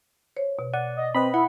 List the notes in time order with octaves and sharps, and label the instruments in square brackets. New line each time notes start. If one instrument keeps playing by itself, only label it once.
[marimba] C5 C#5
B2
[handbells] D5 [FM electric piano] F#5
[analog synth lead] D#5
[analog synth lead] C4 [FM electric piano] B4 D#5 B5
[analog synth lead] E4 [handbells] F#5